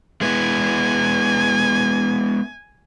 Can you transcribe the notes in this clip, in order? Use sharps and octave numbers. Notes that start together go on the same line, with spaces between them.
G#3 B3 E4 G#5